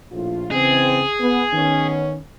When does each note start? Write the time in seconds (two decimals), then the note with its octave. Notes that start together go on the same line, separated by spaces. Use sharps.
0.12 A#1 A2 F4
0.51 C#3 E3 C4 G#4
1.21 B3
1.52 D#3 B3 C#4